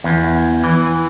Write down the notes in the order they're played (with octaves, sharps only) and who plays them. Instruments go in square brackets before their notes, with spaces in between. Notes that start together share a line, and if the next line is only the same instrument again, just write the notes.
[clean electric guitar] E2
E3